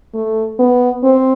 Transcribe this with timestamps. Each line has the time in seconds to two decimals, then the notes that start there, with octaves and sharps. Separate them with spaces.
0.14 A3
0.59 B3
1.04 C4